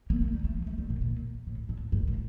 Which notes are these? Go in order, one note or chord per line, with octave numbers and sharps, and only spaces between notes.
A#3
A3
G3
A3
F3
A3
G3
A#2
A#2
A2
A2
G2
A2